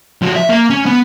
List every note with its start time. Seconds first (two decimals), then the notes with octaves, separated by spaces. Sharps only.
0.22 F3 F#4
0.36 E5
0.49 A#3
0.70 C#4
0.86 B3